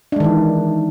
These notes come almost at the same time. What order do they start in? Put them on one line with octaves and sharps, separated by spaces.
D4 G#3 D#3 E3